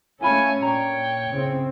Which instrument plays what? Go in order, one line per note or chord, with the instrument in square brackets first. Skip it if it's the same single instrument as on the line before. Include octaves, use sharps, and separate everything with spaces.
[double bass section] A3 C#4 [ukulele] E4 F4 B5 [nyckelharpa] A4 C#5 [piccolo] G#5
[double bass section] A#2 [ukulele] D4 A#5 [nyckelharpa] C#5 [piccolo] G5
[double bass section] A2 C#3 C4